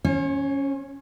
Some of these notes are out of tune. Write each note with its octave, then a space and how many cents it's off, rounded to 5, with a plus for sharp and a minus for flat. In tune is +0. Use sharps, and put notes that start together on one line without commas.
C#4 +0 C#5 -45